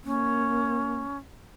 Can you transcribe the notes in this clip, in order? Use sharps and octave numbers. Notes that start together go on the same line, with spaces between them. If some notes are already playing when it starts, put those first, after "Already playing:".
A#3 C#4